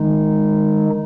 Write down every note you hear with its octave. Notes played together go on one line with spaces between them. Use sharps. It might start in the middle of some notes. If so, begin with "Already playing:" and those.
Already playing: D#3 G#3 D#4